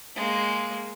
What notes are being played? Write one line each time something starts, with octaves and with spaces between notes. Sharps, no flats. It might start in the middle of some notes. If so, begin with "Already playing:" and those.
G#3 A#3